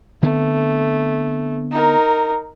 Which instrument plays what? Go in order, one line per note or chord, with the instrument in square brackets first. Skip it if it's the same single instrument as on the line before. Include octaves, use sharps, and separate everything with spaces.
[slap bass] D3 B3 C4 [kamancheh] A3
[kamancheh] D#4 A#4